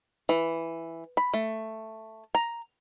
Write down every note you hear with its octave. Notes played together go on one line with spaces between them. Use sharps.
E3
B5
A3
A#5